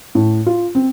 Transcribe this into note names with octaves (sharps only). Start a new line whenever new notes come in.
A2
F4
C4